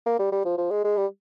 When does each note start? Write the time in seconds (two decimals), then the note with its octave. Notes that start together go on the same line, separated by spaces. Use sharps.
0.06 A#3
0.19 G3
0.32 G3
0.45 F3
0.58 F3
0.71 G#3
0.84 G#3
0.97 G3